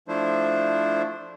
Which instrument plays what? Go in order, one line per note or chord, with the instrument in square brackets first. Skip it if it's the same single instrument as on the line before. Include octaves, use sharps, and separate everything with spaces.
[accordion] F3 A3 D4 E4 C5